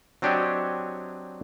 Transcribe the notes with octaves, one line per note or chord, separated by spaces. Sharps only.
F#3 C4 D4 G4 C#5 D#5